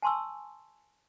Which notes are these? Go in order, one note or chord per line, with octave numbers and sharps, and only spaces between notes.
G#5 A5 C6 C#6 E6